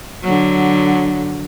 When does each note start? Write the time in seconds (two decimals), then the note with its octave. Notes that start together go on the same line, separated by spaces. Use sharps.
0.23 D3 F#3